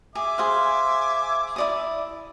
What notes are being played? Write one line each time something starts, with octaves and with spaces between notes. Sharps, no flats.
G#4 E5 G#5 D6
G#4 C5 F5
E4 D5 D#6